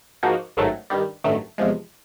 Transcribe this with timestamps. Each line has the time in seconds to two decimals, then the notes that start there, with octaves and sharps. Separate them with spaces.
0.23 G#2 F3 A#3 D#4 F#4
0.57 A1 G#2 D#3 F#3 A3
0.90 G2 D#3 G3
1.24 A1 G2 D#3 F#3 A3
1.58 E2 C3 F3 G#3